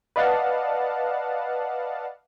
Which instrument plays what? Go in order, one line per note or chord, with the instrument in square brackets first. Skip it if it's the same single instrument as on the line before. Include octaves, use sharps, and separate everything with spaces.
[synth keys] B4 D5 D#5 F5 F#5 A5